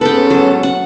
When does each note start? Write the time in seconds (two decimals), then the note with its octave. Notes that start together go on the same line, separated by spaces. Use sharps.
0.01 G#2 B3 C#4 A4 B4 G5
0.30 F#3
0.63 F#5